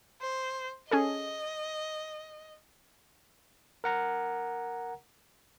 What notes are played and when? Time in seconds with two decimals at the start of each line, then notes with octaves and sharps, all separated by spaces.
0.21 C5
0.91 C#4 G#4 A4 D#5
3.84 A#4 F#5 A#5